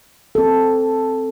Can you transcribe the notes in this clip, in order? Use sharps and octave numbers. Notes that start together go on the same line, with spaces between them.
C4 A4